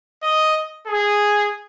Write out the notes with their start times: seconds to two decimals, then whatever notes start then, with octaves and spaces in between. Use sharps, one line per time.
0.23 D#5
0.87 G#4